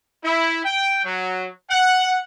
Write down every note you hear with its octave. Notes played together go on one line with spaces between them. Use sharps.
E4
G5
F#3
F#5